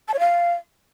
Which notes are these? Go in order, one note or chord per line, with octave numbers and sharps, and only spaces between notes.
A5
C#5
F5